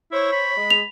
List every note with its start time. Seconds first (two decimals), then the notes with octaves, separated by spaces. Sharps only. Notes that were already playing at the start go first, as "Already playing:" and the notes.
0.11 E4 C5 C#5
0.32 B5
0.57 G#3
0.70 F7